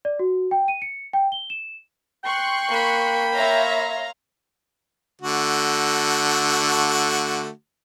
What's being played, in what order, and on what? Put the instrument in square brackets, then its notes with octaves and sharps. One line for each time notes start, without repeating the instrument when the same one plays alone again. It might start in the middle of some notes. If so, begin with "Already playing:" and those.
[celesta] D5
F#4
G5
D#7
C#7
G5
G7
E7
[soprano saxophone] G5 [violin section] C6 C#6 F#6
[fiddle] A#3 B5
[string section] C#5 E5 [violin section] F5 A#5 C6
[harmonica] D3 A3 F#4